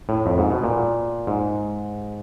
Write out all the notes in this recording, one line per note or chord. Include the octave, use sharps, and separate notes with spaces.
A2
F2
G#2
B2
A#2
G#2